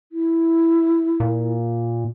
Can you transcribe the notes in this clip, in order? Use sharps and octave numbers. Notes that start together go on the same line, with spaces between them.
E4
A#2